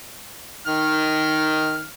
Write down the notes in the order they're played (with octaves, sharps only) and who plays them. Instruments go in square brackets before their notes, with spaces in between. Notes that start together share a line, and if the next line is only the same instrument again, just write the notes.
[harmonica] D#3 F6